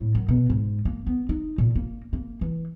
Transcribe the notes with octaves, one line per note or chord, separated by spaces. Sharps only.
A2
F#2
B2
G#2
A#3
B3
D#4
A#2
A#3
A#3
E3